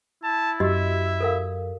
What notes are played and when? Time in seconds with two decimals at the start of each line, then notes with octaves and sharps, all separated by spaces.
0.23 E4 A5
0.60 F#2 F#4 G4 D#5 E5
1.20 A4 A#4 F5